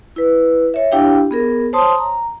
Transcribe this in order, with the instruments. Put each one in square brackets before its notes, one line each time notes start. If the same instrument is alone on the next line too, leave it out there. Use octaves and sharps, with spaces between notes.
[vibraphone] E4 B4
C#5 E5
D4 E4 G4 F5 G5
B3 G#4 A#4
C5 C#5 A5 C6 D#6
A#5